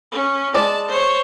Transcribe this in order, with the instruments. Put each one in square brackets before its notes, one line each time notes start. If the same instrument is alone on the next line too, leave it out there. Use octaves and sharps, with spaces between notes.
[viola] C#4
[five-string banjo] G#3 D5 [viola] A5
[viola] C5 C#5